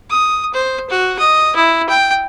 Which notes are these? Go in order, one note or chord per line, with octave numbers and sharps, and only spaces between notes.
D#6
C5
F#4
D#5
E4
G5